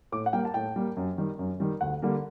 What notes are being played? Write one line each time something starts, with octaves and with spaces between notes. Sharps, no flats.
A2 D6
F#5
G3 A#3 G5
A5
A2 G5
G3 A#3
F#2
D#3 G3
F#2
D#3 G3
D2 F#5
D3 G3 A#3